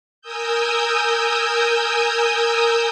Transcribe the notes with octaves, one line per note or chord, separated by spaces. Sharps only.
A#4 G#5 D#6 E6 G6